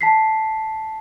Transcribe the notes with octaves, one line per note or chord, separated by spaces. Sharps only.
A5 B6 C7